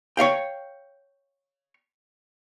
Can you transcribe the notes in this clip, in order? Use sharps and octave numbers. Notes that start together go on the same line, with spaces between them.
C#5 D#5 F5 G5